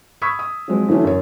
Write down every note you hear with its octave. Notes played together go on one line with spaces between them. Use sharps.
B5 C#6 D#6 E6 G#6 B6
D#6
F3 F#3 G#3 C4
D3 E3 F#3 A3 C#4
F#2 C#5